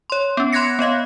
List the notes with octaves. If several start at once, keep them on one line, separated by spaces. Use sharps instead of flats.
C#5 C6
B3 C#4
B5 C6 F#6 G#6 A#6 C#7
B3 C#5 D#5 F5